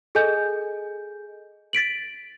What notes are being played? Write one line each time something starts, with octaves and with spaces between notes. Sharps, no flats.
G#4 A4 D#5 G#5 G6
A6 B6 D7 F#7